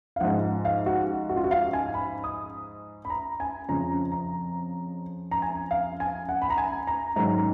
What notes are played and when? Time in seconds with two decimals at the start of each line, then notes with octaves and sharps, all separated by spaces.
0.16 F5
0.20 G#2 F3 F#5
0.65 F5
0.86 F#4
1.29 F#4
1.36 F4
1.44 F#4
1.51 F5
1.73 G#5
1.94 B5
2.24 D#6
3.05 B5
3.10 A#5
3.40 G#5
3.68 F2 C#3 F3 A#5
4.12 A#5
5.31 A#5
5.42 G#5
5.71 F5
6.00 G#5
6.29 F#5
6.42 B5
6.50 A#5
6.58 G#5
6.87 A#5
7.16 G#2 D#3 F#3 A#5